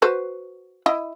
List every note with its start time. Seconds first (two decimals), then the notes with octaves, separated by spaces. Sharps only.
0.02 F#4 B4 C5
0.86 E4 D#5